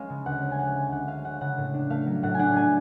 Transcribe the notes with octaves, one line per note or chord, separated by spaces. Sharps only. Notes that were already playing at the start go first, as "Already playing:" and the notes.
Already playing: G#3 C#4 F5
C#3
D2 F#5
C#4
G#5
G#3 F#5
C#3
D2 F#5
C#4 F5
G#3 F#5
C#3 F#5
A2
D4
A3 F5
F#3
A2 F#5
D4 F#5 G#5
A3 G#5